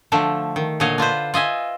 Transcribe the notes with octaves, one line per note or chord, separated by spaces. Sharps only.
D3 F3 A3 D4
D#3
A#2 D3 D4 C#5 D#5 F5
D4 F4 B4 C5
F4 D#5 E5 G#5